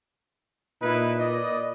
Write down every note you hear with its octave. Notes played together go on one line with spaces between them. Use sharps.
A#2 D#4 E4 B4
D5 D#5